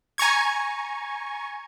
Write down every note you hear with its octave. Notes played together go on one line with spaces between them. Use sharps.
G#5 A#5 C#6 G#6